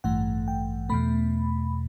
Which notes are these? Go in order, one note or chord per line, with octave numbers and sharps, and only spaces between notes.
A1 G2 E3 A3 F#5
G5
E2 B2 A3 B5